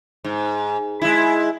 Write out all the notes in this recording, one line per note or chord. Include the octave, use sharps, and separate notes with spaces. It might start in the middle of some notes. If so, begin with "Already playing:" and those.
G#2
G#3 E4